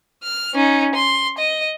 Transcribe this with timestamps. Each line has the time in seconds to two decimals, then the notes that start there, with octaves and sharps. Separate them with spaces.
0.24 F6
0.54 C#4 D#4
0.95 C6
1.39 D#5